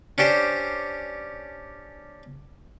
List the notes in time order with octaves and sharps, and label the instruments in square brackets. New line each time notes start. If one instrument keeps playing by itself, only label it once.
[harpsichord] C#4 D4 G4 C5 C6